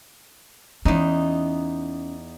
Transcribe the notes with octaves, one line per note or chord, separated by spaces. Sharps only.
E2 C#4 D#4